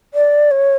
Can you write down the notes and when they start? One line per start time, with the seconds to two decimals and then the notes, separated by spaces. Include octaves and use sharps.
0.14 D5
0.51 C#5